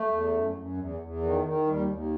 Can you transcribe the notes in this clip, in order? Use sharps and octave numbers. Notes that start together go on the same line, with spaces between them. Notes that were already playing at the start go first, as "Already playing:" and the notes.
Already playing: A3
E2
F#2
F#2
E2
E2
D#3
D#3
D#2 G3
D#2